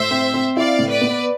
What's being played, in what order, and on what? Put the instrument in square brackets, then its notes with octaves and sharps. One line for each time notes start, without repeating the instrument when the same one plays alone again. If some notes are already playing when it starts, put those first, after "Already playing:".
Already playing: [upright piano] A2 [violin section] C5 E5
[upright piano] C4
C4
[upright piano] E4 [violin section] D5 F5
[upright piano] A2
[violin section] B4 D5
[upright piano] B3